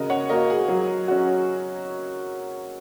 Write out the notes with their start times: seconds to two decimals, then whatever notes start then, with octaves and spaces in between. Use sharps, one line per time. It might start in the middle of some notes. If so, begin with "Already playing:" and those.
Already playing: C#3 F#4 A#4 D#5
0.10 C#5 F#5
0.29 A#3 F#4 A#4 D#5
0.50 G#4
0.68 F#3
1.08 C#4 F#4